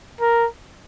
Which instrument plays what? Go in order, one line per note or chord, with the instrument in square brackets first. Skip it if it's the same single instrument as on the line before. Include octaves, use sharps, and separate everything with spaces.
[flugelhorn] A#4